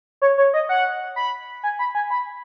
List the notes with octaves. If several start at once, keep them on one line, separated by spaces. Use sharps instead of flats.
C#5
C#5
D#5
F#5
B5
G#5
B5
G#5
B5